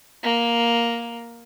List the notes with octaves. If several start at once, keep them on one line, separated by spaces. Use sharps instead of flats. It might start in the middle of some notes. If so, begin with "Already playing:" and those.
A#3